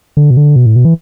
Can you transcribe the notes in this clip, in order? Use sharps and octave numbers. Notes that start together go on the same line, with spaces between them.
D3
B2
D3
B2
A2
B2
E3